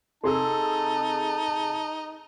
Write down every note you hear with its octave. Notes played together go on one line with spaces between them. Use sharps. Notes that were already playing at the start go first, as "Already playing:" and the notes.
C3 D#4 G#4 A4 A5 C6 E6